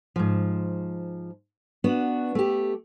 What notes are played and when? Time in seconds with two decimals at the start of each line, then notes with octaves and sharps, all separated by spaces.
0.16 G#2 F3
1.84 B3 D4 F#4
2.35 A3 G4